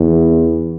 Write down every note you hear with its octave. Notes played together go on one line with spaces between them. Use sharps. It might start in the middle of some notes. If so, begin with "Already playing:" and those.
Already playing: E2